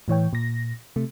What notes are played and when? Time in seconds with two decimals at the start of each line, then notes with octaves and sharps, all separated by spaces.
0.08 A2 E3 C#5 G5
0.33 A#2 A#6
0.96 C3 A3